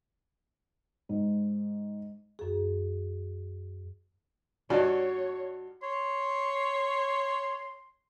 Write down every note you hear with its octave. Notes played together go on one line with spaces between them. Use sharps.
G#2
F#2 G#4
G2 F#3 D#4 F#4 C#5 D5
C#5 C6